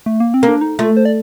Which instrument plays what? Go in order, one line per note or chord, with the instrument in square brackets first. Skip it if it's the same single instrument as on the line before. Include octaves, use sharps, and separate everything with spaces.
[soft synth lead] A3
A#3
C4
[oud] A#3
[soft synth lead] D4
D#4
[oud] A3 [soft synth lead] F4
[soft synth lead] C5
D5